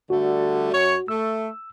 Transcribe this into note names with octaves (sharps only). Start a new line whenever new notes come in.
D3 G3 A3 F#4
F#2 C#5
A3 E6